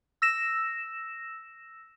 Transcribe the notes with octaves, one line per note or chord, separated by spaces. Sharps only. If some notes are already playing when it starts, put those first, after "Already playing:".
E6 A#6 E7